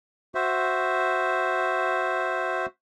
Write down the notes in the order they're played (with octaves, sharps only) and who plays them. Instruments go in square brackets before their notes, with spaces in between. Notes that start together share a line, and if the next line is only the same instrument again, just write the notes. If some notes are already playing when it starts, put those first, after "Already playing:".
[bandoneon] F#4 C5 E5